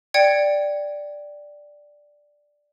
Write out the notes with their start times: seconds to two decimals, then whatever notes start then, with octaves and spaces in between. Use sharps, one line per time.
0.14 D5 G5 G#6 C#7